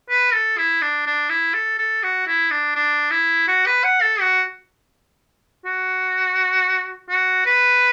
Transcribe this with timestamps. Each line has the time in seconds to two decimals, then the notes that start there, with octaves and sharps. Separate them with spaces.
0.10 B4
0.33 A4
0.58 E4
0.82 D4
1.06 D4
1.29 E4
1.54 A4
1.78 A4
2.03 F#4
2.27 E4
2.51 D4
2.75 D4
3.11 E4
3.48 F#4
3.66 B4
3.84 F#5
4.01 A4
4.20 F#4
5.65 F#4
7.10 F#4
7.46 B4